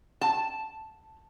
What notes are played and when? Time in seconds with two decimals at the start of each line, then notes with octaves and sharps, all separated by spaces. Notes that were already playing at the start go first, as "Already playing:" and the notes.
0.21 A5